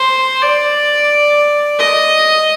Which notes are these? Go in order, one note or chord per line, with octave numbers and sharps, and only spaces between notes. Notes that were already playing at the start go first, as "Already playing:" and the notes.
Already playing: C5
D5
D#5